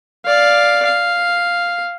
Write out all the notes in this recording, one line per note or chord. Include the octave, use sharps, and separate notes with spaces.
D5 F5
F5